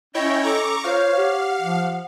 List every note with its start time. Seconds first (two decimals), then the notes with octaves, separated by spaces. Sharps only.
0.15 C#4 E4 C#5 D#5 G5
0.44 A4 A#5 C#6 D6
0.84 F4 C5 C#5 F5
1.17 G4 F#5
1.61 F3